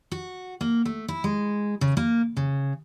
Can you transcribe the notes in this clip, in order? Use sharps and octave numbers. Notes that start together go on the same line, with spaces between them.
F#4
A#3
A3
E4
G#3
C#3
A#3
C#3